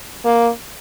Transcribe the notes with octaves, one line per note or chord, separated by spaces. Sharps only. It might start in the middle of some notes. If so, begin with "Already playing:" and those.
A#3